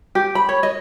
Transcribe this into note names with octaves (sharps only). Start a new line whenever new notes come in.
G4
B5
C#5
D#5